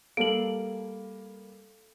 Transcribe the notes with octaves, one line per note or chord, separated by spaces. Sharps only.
G3 A#3 A4 F5 D7 F#7